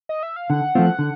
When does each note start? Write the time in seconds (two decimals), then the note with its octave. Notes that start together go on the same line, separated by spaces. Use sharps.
0.09 D#5
0.23 E5
0.36 F5
0.50 D3 F#5
0.75 F3 A3 C4 F4
0.99 D3